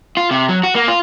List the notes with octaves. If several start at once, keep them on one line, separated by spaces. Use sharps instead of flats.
F4
C3
F#3
F#4
A#3
F4